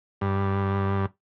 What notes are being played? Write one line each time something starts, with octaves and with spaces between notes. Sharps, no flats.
G2